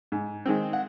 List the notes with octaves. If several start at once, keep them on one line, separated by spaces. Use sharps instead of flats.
G#2
D#3 G#3 C4
F#5